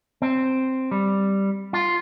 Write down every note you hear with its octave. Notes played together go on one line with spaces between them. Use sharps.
C4
G3
F4